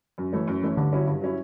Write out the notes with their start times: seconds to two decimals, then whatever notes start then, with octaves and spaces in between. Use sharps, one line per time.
0.18 F#2
0.33 E3 A3 C#4
0.48 F#2
0.62 E3 A3 C#4
0.77 G2 D3
0.92 F#3 C#4 E4
1.07 G2
1.21 F#3 C#4 E4